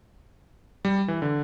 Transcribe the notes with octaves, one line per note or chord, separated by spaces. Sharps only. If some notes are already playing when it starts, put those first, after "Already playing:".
G3
E3
D3